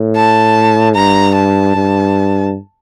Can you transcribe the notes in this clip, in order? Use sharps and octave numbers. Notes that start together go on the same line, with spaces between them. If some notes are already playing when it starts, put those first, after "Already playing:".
Already playing: A2
A5
G2 A#5
A5
G2